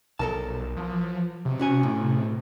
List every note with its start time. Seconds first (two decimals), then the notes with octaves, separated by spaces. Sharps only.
0.19 B1 A4 A#4 A5
0.76 F3
1.45 C3
1.59 C#4 F#4 G#5
1.83 A2